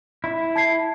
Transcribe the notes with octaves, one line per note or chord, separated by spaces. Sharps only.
E4
A5 G#6 C7